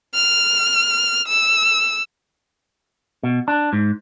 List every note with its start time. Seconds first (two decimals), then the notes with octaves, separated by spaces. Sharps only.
0.14 F6
1.28 E6
3.23 B2
3.48 D4
3.73 G#2